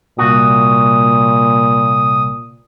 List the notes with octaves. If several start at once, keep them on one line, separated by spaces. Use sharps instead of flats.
C2 A#2 F#4 D#6